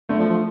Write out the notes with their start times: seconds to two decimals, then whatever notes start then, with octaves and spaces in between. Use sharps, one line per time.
0.09 D3 A3
0.19 F3
0.30 F3